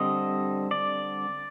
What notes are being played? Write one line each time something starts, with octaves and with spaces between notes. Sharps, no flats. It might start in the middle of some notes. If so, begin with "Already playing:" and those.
Already playing: D3 G3 C4 D#5
D5